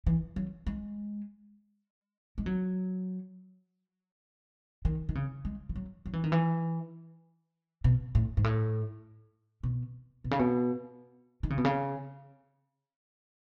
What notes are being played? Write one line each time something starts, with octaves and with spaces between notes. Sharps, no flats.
E3
F#3
G#3
G#3
F#3
D#3
D#3
C#3
G#3
E3
F#3
F#3
E3
D#3
E3
B2
A2
G#2
A2
B2
B2
C#3
B2
D#3
C#3
B2
C#3